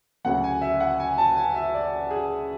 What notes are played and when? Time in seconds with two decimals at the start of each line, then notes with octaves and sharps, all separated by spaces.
0.24 D2 C#3 F#3 F#5
0.44 G#5
0.62 E5
0.80 F#5
1.00 G#5
1.18 A5
1.36 G#5
1.55 E5
1.74 D5
2.11 G#4